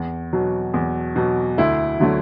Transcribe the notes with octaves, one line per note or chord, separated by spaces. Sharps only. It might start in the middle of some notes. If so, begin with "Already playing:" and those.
Already playing: E2
B2 F#3
E2
B2 F#3
D2 E4
D3 F#3 A3